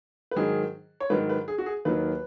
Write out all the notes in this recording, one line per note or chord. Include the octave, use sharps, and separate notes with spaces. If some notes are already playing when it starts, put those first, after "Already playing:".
B4
G#2 D#3 F#3 G#4
C#5
G#2 D#3 F#3 B4
B4
G#4
F#4
G#4
D#2 D#3 F#3 B4